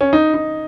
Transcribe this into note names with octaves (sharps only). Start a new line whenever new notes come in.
C#4
D#4
D#4